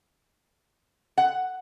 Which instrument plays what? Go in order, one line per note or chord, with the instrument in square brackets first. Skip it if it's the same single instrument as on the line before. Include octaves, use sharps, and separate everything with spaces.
[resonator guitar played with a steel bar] F#5